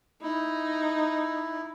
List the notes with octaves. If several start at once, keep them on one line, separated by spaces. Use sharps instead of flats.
D#4 E4